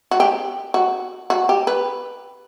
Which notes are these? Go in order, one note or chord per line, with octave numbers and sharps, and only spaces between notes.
F#4
G4
F#4
F#4
G4
B4